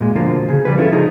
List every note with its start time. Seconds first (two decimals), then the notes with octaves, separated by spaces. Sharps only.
0.01 A#2 G#3
0.15 B2 D3 F3 A#3 F4
0.49 C#3 G#4
0.65 F3 G3 B4
0.78 C#4 E4 F4 A4
0.92 C#3 F3 D#4 G#4